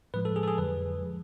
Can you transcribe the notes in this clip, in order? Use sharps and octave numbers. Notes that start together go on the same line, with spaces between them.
A2 F3 G#3 B4
A4
G#4
A4
G#4
F2 D3 F#3 B4
F3 G#3